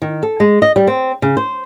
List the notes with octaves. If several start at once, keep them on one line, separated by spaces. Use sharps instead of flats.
D#3
A4
G#3
D#5
G3
C4
C#3
C5